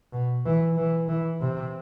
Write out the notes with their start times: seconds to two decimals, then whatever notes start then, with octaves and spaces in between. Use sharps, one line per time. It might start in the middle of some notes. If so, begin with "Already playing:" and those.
0.13 B2
0.46 E3
0.77 E3
1.08 E3
1.41 C3